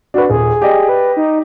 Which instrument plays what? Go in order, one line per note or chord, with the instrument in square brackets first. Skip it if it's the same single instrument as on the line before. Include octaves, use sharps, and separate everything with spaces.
[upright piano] D4 B4 [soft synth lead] F#4
[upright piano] D#1 [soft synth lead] G#4
[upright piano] G4 D5 D#5
[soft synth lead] B4
D#4